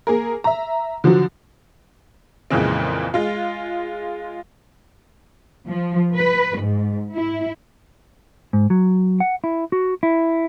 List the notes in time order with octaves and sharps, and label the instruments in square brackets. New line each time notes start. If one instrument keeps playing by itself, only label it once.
[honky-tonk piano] A#3 G#4 A#4
E5 A#5
D3 F3 F#3 F#4
F2 A#2 C#3 E3 G#3 C4
G#3 F4
[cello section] F3
B4
G#2
E4
[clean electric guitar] G#2
F#3
F#5
E4
F#4
E4